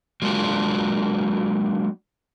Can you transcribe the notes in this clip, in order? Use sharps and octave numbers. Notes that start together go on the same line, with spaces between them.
F#3 G#3 A#3 D4 F4 G4